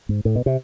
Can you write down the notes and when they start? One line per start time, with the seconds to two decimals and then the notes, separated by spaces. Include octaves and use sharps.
0.09 G#2
0.25 A2
0.36 B2
0.46 C3